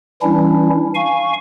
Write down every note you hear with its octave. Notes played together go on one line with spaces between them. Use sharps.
E3 G3 C#4 D4 E4
F5 G#5 C#6